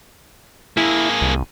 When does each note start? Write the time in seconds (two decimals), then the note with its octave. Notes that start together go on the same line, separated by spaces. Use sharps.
0.77 A#3 E4 G#4
1.21 C2